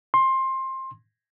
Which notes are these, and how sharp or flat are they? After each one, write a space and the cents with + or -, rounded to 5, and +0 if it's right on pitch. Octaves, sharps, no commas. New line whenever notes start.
C6 +20